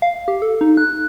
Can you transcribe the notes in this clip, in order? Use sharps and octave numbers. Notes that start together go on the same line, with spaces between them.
F5
G4
A4
D#4
F#6